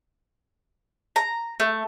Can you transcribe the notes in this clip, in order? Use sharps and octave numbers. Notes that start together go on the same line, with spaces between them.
A#5
A3